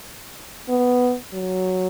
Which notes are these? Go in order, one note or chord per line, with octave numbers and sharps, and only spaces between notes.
B3
F#3